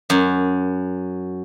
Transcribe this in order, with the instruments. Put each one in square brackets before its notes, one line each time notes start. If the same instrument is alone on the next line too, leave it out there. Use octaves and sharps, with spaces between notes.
[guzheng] F#2